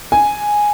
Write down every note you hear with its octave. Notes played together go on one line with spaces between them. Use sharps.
G#5